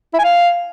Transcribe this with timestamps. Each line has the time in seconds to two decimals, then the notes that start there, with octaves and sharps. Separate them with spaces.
0.13 E4
0.19 G#5
0.24 F5